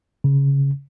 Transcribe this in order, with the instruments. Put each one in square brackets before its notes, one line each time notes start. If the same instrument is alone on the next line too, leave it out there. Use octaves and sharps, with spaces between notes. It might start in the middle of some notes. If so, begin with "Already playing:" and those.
[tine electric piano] C#3